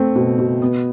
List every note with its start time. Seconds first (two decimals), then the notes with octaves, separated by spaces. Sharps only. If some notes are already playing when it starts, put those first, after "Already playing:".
Already playing: A3 C4
0.16 B2
0.39 B2
0.62 B3